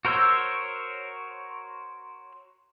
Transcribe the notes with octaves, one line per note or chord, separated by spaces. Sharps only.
F#4 A#4 C5 C#5 E6